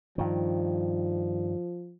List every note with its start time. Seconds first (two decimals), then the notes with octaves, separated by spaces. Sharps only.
0.18 G2 D#3 F3